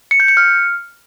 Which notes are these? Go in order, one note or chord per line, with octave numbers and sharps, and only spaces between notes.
C#7
G6
C#7
F6